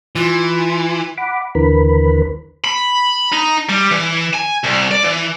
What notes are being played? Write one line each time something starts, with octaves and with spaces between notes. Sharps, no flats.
E3 F4
F#5 B5 D6
D#2 D3 E3 A#4 B4 B5
B5
D#4
G3
E3
G#5
C2
D5
E3